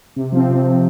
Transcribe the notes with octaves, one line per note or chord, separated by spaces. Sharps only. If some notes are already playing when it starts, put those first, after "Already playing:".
C3
F3 C4
C3
F3 C4